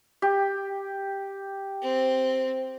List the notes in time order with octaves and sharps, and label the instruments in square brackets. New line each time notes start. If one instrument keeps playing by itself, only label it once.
[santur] G4
[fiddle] C4